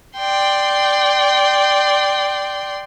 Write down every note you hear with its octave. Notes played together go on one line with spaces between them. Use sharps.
D5 G5 C6